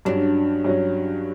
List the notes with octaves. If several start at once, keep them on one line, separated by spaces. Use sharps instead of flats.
G2 F#3 C#4 D4
G2 F#3 C#4